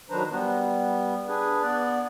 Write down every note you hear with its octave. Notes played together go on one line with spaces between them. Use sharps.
D#3 F#3 D4 B4 C5 A#5
G3 B3
D4 G#4 B4
B3 D5